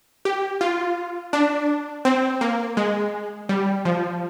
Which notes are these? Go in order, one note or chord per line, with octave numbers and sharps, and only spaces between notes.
G4
F4
D4
C4
A#3
G#3
G3
F3